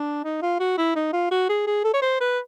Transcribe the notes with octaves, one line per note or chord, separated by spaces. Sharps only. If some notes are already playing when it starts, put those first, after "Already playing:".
Already playing: D4
D#4
F4
F#4
E4
D#4
F4
F#4
G#4
G#4
A4
C#5
C5
B4